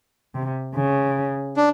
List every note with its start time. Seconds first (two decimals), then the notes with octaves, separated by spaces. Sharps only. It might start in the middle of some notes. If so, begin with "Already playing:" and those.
0.35 C3
0.75 C#3
1.57 D4